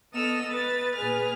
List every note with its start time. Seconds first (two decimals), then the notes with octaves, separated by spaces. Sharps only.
0.12 B3 A4 D#5 E6 F6
0.50 B4 A6
0.96 A#2 G#4 B4 F6